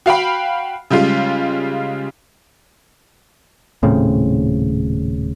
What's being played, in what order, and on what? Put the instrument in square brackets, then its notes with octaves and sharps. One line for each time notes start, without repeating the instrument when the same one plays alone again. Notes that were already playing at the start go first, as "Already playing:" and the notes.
[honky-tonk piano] F#4 F5 G5 B5
C#3 G3 G#3 F4
[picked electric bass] D#1 A2 C#3 C4